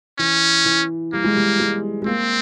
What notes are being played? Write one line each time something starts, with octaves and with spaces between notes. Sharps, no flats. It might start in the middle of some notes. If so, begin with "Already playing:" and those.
E3 C#4
E3
G3 A#3
G#3
G3
G#3
G#3
A#3 C4